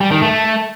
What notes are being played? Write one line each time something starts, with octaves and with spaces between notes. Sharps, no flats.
G3
D#3
A3